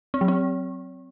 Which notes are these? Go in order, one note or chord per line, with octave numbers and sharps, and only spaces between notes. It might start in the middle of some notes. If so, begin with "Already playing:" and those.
C4
F#3
C4